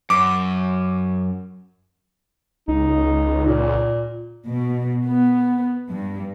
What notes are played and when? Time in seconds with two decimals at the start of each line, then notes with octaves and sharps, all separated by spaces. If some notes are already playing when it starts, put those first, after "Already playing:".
0.10 F#2 D6
2.68 C#2 D#4
3.46 A#2
4.47 B2
5.05 B3
5.89 G2